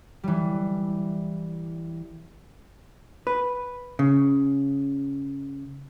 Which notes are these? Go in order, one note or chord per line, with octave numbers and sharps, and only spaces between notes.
E3 G3
B4
C#3